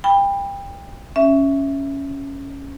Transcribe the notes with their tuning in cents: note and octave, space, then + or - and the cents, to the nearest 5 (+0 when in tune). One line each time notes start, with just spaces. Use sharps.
G5 +25 B5 +0
C#4 +0 E5 +0